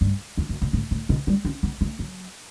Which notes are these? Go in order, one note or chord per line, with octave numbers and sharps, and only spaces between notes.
G2
E2
F#2
B2
A2
A2
B2
G3
C#4
B3
A3
F#3